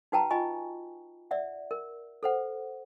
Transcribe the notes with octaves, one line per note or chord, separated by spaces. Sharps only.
D#4 F#4 B4 G5 A5 A#5
F4 D#5 G#5 B5 C#6
D5 E5 F#5
A#4
A4 C5 F#5